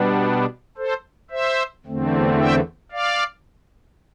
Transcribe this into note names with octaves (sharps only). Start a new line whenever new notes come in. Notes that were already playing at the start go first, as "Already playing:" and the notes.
Already playing: B2 G3 B3 D4
A4 C5
C5 E5
E2 D3 A3 C4
E5 G5
D5 F5